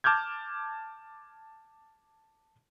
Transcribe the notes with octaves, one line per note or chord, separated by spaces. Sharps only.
A5 D6 F6 G6 G#6